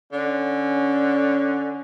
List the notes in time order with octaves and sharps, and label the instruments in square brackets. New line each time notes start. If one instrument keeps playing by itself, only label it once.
[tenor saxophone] D3 [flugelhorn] C#4